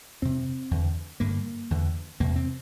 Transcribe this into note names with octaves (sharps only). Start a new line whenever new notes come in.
F2 C3 C4
E2 D3
G2 D3 A#3
E2 D3
E2 C3 A#3
C4